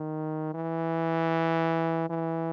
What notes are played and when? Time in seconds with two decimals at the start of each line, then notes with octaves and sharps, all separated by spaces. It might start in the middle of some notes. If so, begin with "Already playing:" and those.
Already playing: D#3
0.54 E3
2.09 E3